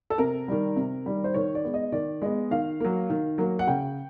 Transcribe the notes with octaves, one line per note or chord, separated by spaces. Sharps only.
A4
C3 A#4
D#3 G3
C3
D#3 G3
C5
D#3 C#5
D5
G#3 B3
D#5
D#3 D5
G#3 B3 D#5
D#3 F5
F#3 A#3
D#3
F#3 A#3
F#5
C#3 G5